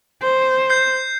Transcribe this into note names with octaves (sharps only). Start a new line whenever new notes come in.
C5
G6 C7